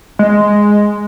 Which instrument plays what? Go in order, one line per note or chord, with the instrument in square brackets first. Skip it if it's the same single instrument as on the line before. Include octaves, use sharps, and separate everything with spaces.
[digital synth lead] G#3